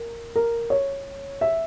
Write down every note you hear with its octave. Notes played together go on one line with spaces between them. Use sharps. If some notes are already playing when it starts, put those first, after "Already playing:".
Already playing: A#4
A#4
C#5
E5